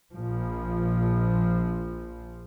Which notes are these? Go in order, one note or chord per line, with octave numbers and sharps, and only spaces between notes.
A#1 F3